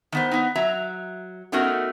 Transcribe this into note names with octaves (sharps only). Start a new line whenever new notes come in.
D#3 B3 C5
B3 D#4
F#3 E5 A#5
A3 B3 C#4 D#4 F#4 A#4